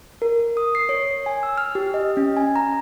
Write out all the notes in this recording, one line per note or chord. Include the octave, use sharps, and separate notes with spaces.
A#4
D#6
C7
C#5
G#5
E6
F6
G4
D#5
C#4
G#5
A#5